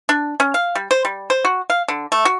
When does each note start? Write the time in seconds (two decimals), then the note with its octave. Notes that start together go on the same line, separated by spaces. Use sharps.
0.09 D4
0.40 C#4
0.54 F5
0.75 G3
0.91 C5
1.05 G3
1.30 C5
1.45 F#4
1.70 F5
1.88 D3
2.12 A3
2.25 F#4